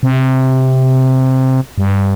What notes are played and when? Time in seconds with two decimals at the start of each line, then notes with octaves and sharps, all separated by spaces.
0.03 C3
1.78 G2